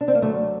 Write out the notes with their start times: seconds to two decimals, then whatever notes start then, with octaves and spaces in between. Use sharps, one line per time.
0.01 D4
0.08 C4
0.15 A#3
0.22 D2 D3 F#3 A3